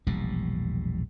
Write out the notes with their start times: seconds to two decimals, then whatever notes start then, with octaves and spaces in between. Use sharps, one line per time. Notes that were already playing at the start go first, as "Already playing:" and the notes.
0.07 E1 A#1 A2 G3